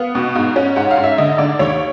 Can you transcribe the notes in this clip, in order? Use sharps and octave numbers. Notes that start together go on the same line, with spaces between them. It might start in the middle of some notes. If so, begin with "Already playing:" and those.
Already playing: B3 F5
B2
G#2
C#4
G#2 F#5
F5
G#2
E5
D3 D#5
D3 D5
D#2 C#5